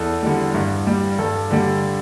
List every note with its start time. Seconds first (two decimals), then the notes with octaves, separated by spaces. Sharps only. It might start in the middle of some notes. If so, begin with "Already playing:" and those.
Already playing: E2 A4
0.23 D3 G3
0.54 G2
0.87 G3
1.19 G2 A4
1.51 D3 G3